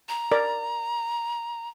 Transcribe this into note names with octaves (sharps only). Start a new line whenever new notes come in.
A#5
A#4 D5